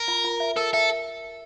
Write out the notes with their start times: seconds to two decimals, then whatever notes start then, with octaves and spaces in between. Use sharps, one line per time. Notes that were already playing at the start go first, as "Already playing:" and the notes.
Already playing: A#4
0.08 F4
0.24 F4
0.40 E5
0.56 A4 A#4
0.73 A4 E5